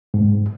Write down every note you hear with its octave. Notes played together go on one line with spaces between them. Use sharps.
G#2